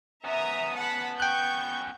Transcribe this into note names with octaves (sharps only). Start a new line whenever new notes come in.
B3 C#4 E5 A#5 D#6
F#5 A5 B5
G5 C#6 F#6 G6